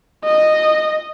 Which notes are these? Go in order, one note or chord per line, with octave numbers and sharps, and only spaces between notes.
D#5